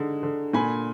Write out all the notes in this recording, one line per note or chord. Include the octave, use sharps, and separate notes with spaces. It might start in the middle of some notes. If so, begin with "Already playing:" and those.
Already playing: D3 G#3 D#4
D3
A#2 G#5 B5